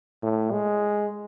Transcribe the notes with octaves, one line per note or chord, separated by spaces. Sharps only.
A2
G#3